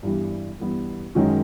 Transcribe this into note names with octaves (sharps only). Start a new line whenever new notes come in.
G2 E3 G3 B3
G2 E3 G3 B3
F#2 D#3 G#3 C#4 F#4